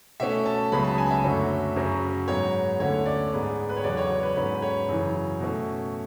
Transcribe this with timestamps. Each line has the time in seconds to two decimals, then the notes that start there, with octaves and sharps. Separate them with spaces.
0.20 B2 A3 C#4 E5
0.46 A5
0.72 C#2 C#3 F#3 B3 B5
0.84 A5
0.98 G#5
1.11 E5
1.24 F#2 D3 F#3 A3 C#4
1.76 F#2 C#3 F#3 C#4
2.28 G#2 F#3 B3 C#5
2.80 D2 D3 A3 C#4 C#5
3.06 D5
3.32 G#2 G#3 B3
3.69 B4
3.77 C#5
3.84 E2 C#3 F#3 C#4 D5
3.97 C#5
4.10 C#5
4.23 B4
4.36 G#2 F#3 C#4 B4
4.62 C#5
4.88 F#2 C#3 E3
5.40 B2 A3 C#4